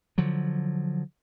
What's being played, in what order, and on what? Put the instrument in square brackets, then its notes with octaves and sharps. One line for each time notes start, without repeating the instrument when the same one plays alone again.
[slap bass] D3 F3 F#3